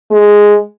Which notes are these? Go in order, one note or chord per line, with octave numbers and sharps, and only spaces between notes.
G#3